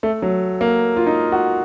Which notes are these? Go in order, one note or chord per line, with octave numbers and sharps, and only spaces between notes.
A3
F#3
A#3
F4
D#4
F#4